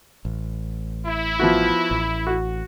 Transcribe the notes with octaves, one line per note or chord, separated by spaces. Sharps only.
A1
E4
F3 B3 F#4
A1
F#4